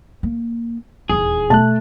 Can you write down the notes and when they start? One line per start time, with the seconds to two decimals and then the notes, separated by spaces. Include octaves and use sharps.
0.23 A#3
1.09 D#1 E2 G#4
1.50 B2 A3 A5 F#6